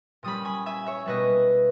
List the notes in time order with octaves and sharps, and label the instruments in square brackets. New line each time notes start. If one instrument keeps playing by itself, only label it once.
[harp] A#2 G3 C#4 B5 D#6
G#5 B5
E5 G#5
C#5 E5
B2 G3 A#3 B4 D#5